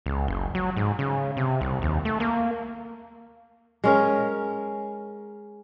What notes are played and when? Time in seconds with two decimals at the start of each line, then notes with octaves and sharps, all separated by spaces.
0.06 C#2
0.28 F#1
0.55 F#3
0.77 G#2
0.99 C#3
1.37 C3
1.61 C2
1.82 D#2
2.05 A3
2.20 A#3
3.84 G#3 C#4 A#4